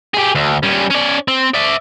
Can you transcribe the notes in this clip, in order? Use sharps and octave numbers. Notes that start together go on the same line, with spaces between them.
G4 G#4
D2
G3 C#4
C#4 D5
C4
D5 E5